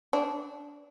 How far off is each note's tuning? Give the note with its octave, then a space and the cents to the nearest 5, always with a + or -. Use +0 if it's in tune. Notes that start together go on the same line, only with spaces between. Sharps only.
D4 -20